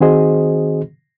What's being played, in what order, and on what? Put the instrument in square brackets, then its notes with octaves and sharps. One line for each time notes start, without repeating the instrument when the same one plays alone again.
[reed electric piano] D#3 C4 F#4 G#4 C5 D#5